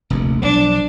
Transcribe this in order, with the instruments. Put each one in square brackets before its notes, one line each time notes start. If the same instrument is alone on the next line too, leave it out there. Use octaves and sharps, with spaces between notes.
[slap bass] F1 A#1 D#2
[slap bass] B1 F3 [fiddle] D4